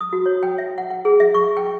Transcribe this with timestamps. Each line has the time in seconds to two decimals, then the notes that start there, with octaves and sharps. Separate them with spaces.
0.01 D#6
0.13 F#4
0.26 C#5
0.43 G5
0.58 E5
0.78 F#5
0.90 F#5
1.05 G#4
1.20 E5
1.34 C#6
1.57 G5